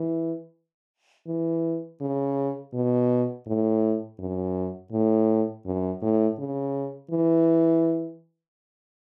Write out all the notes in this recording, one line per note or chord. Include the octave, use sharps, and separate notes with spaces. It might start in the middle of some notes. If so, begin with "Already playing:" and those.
Already playing: E3
E3
C#3
B2
A2
F#2
A2
F#2
A2
C#3
E3